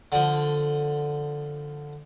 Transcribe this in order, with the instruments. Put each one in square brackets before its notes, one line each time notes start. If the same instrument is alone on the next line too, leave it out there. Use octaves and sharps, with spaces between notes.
[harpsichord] D3 F3